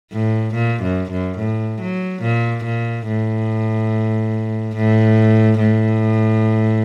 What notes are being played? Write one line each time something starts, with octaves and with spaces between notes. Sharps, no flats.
A2
A#2
F#2
F#2
A2
F#3
A#2
A#2
A2
A2
A2